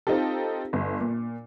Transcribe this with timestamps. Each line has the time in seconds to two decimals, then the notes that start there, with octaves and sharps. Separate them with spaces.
0.07 C4 D#4 F4 G4 A4
0.73 G1
1.00 A#2